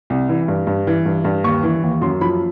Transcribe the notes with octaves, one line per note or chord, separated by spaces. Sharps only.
C2
E3
G2
G2
E3
G2
G2
D#2 C#6
E3
D#2
F#2 C6
F3 B5